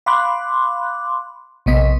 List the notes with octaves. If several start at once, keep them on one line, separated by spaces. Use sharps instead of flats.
F5 B5 C6 D6 F#6
A#1 C3 B3 D#5 B6